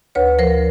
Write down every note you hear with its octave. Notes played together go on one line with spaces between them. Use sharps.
D2 B4 C#5
F3 A#4 C5